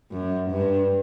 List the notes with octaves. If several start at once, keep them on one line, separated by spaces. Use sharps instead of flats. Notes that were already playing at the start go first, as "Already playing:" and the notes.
F#2
G2